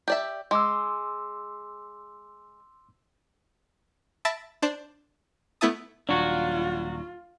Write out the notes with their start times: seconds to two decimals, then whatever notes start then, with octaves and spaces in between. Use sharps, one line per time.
0.08 G4 D5 E5
0.51 G#3 C6 D6 E6
4.25 E5 A5 B5 A6 A#6 D7
4.62 D4 C5 D5 A5 D6
5.61 A3 B3 E4 E5 A5 D#6
6.09 D#1 F#3 D4 F4 F#4